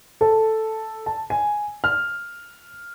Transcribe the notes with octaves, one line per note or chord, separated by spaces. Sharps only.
A4
A5
G#5
F6